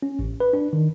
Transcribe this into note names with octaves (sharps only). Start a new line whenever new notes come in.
C#4
A1
B4
D4
D#3